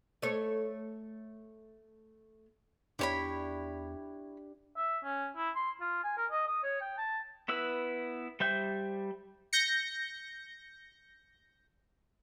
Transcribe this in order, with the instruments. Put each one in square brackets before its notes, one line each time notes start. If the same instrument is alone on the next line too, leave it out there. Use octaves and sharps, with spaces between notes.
[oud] A3 C#5
[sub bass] E2 [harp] D4 G4 [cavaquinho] E4 C#5 B5
[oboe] E5
C#4
E4
C6
F4
G#5
A#4
D#5
D#6
C#5
G5
A5
[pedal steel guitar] B3 E4 B4 E6
G3 C5 E5 G6
[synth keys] G6 A#6 C#7